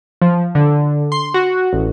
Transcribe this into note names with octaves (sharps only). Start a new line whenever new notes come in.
F3
D3
C6
F#4
A1